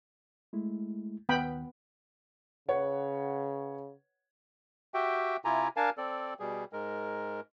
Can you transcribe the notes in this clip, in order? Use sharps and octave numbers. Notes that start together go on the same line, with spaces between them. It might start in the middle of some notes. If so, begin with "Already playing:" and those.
G#3 A3 E4
D#2 D#3 B3 G5 B5
C#3 B4 C#5 F#5
F#4 G4 E5 G5
C3 E4 F4 G4 G#5 A#5
D4 A#4 F5 G#5 A5
C4 A4 D5
B2 G3 G#4
G#2 G#3 A#4